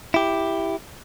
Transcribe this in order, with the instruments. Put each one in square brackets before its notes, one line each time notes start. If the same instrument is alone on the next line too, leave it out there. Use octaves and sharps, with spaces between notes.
[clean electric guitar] E4 G4